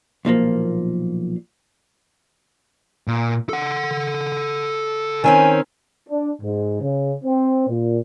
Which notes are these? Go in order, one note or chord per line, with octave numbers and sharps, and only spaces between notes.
B1 A#2 F3 A#3
A#2
A4 F#5
D#3 C4 C#4 G#5
D4
G#2
C#3
C4
A#2